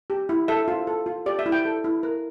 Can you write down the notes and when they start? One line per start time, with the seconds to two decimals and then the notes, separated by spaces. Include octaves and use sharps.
0.10 G4
0.29 E4
0.48 A4 E5
0.68 F4
0.87 A4
1.06 F4
1.26 G4 D5
1.39 E5
1.46 E4
1.52 G5
1.65 A4
1.84 E4
2.03 A#4